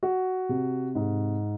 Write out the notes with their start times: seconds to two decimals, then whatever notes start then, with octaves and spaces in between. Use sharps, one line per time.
0.03 F#4
0.49 C3
0.95 G#2